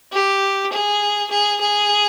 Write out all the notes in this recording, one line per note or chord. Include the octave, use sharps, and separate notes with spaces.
G4
G#4
G#4
G#4